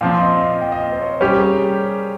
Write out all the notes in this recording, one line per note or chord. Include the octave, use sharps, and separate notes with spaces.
A#2 F3 C4 F5
D#5
D#5
G5
D#5
F5
C5
C#5
G3 C#4 G4 C5
A#4
G#4